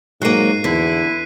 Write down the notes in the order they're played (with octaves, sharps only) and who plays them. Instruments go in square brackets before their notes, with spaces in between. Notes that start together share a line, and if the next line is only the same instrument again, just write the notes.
[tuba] G#2 [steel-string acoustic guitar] F#3 A#3 [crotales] F#6 C7 D#7
[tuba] E2 [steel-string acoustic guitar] D3 [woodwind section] E4 [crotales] B6